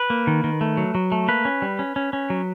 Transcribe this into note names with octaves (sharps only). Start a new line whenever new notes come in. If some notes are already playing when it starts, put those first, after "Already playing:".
Already playing: B4
A#3
D#3
D#3
A3
F#3
F#3
A3
A#3 B4
C#4
G3
C#4
C#4
C#4
F#3